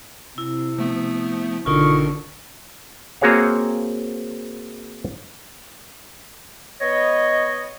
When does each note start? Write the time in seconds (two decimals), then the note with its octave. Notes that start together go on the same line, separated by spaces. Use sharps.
0.38 C3 E4
0.78 F3 A3 B3
1.66 G#1 B2 D3 D#4 F4 A#4 C#6
3.21 A#3 C4 F#4 G#4 C#5 F5
6.81 B3 C#5 D#5